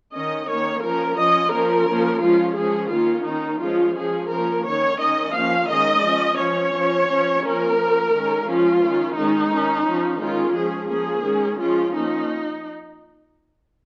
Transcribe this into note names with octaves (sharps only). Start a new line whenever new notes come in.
D#3 C#4 D#5
D#3 A#3 C#4 C#5
F3 C#4 A#4
F3 C#4 D#5
F3 A#3 C#4 A#4
F3 A#3 C#4
F3 G#3 C#4 F4
F3 G#3 C#4 G#4
D#3 A#3 C#4 F4
D#3 C#4 D#4
F3 G#3 C#4 F4
F3 C#4 G#4
F3 A#3 C#4 A#4
D#3 C#4 C#5
D#3 C#4 D#5
F3 A#3 C#4 F5
D#3 G#3 C#4 D#5
F3 C#4
F3 C#4 C#5
F3 C#4
F3 C#4
F3 A#3 C#4 A#4
F3 A#3 C#4
D#3 G#3 C#4
F3 G#3 C#4 F4
D#3 C#4
D#3 G#3 C#4 D#4
D#3 C#4
F3 C#4
D#3 G#3 C#4 F4
F3 C#4 G#4
F3 A#3 C#4 G#4
D#3 G#3 C#4
F3 G#3 C#4 F4
F3 A#3 C#4 D#4